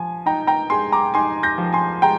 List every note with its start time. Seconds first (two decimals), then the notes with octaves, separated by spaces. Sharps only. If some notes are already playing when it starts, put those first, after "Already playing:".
Already playing: F3 G#5
0.26 D#4 G5 A#5
0.47 G5 A#5
0.70 G#3 G#5 C6
0.92 A#5 D6
1.14 D#4 G#5 C6
1.43 G6 A#6
1.58 F3
1.73 G#5 C6
2.02 G#3 G5 A#5